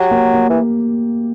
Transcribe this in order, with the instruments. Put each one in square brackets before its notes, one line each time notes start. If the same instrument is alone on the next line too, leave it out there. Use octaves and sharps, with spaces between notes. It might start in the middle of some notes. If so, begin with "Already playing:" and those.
Already playing: [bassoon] F#3 [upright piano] G4
[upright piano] A#3
A#3
[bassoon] E3